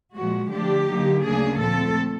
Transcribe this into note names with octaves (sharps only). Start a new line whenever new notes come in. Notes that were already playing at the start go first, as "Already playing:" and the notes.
A#2 F3 G#3 F#4
D3 F3 A3 D4 G4
D3 F#3 A#3 D#4
D2 C#3 F#3 A#3 D4 G#4
A#2 F3 A3 C4 A4